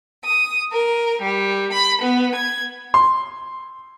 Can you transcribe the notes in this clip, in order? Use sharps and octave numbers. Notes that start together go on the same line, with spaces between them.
D#6
A#4
G3
B5
B3
G#6
C6